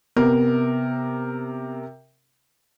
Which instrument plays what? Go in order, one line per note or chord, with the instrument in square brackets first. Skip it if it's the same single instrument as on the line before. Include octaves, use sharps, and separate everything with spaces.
[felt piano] C3 A#4 [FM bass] B3